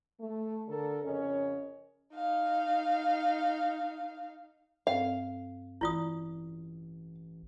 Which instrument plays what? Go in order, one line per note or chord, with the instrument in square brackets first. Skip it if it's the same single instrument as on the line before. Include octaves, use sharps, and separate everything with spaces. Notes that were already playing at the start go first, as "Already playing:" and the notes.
[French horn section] A3
D3 A4 A#4
F2 C#3 C#4 A#4 C#5 D#5
[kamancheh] D#4 F5
[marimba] G2 C4 A4 [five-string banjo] F5
[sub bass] A1 [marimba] E3 D5 [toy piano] E4 F4 D#6